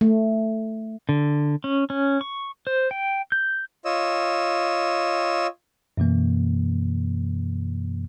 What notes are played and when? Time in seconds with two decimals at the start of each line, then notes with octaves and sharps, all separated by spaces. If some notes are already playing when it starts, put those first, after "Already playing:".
0.01 A3
1.09 D3
1.64 C#4
1.90 C#4
2.21 C#6
2.67 C5
2.91 G5
3.32 G6
3.85 F4 C#5 D#5 E6
5.97 F#2 B2 E3 A#3